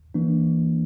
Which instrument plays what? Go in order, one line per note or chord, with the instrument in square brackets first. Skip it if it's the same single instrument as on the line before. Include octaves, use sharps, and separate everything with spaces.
[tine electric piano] E3 A#3 D4